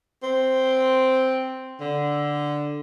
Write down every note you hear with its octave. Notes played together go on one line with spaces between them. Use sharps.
C4
D3